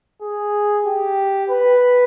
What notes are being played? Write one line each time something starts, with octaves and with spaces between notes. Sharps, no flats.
G#4
G4
B4